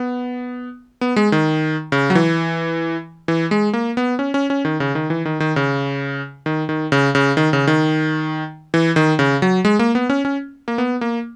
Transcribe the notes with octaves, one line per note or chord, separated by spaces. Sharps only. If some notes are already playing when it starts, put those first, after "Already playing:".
Already playing: B3
B3
G#3
D#3
C#3
F#3
E3
E3
G#3
A#3
B3
C#4
C#4
C#4
D#3
C#3
D#3
E3
D#3
D#3
C#3
D#3
D#3
C#3
C#3
D#3
C#3
D#3
E3
D#3
C#3
F#3
G#3
A#3
B3
C#4
C#4
A#3
B3
A#3